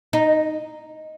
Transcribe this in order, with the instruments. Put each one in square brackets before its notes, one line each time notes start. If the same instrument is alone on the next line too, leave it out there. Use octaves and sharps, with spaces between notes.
[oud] D#4